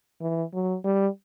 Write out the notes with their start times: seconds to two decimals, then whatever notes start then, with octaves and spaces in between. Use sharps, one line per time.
0.21 E3
0.54 F#3
0.85 G3